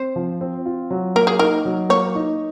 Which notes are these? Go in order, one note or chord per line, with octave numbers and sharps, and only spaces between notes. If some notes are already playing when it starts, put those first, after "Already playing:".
Already playing: C4 C5
F3
C4
F4
F#3
A#3 A#4
G#4
D#4 A#4
F#3
A#3 C#5
D#4